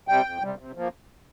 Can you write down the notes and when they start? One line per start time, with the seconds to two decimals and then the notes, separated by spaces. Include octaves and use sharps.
0.08 C3 G3 G5
0.25 F2
0.42 C3 G3
0.58 C3
0.75 F3 A#3